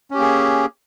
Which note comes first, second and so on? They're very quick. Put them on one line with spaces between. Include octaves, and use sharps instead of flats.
C#4 G4 A#3 G#4